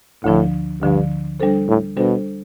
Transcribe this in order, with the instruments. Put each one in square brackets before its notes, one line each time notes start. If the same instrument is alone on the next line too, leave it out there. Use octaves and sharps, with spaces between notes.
[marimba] D2 D3 F3 [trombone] A2
[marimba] D2 D3 F3 [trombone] G2
[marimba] G3 D4 A4 C5
[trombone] A2
[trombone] B2 [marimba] G3 D4 A4 C5